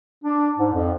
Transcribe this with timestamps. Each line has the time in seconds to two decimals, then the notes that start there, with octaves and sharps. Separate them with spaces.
0.24 D4
0.58 G#2
0.74 F2